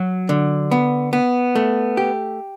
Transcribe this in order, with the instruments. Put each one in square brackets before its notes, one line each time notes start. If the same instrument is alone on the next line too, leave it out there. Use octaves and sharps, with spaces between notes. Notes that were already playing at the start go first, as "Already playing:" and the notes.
Already playing: [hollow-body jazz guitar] F#3
D3
B3
B3
A3
G4